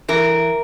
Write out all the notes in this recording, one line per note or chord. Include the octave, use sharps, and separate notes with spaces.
E3 A#4